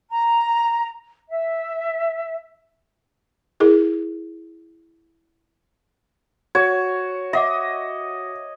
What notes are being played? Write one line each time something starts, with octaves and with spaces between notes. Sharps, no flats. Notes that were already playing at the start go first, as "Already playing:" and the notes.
A#5
E5
E4 G#4 A#4
F#4 C#5 G#6
D#5 E5 F#5 D6